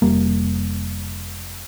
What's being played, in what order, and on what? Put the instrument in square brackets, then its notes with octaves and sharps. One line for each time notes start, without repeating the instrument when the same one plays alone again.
[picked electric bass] F1 G3 A#3